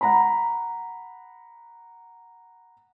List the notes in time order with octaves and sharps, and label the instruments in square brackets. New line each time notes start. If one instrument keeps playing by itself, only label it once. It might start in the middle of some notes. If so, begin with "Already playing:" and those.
[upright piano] F#5 A#5 B5